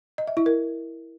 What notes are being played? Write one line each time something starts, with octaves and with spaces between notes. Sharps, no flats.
D#5
E5
E4
A#4